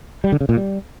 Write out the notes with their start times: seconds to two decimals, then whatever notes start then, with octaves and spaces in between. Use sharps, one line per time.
0.24 G3
0.32 D3
0.41 C#3
0.49 A#2
0.57 G3